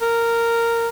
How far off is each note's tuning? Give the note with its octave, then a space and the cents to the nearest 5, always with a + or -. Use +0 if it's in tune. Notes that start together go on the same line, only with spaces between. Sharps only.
A#4 -10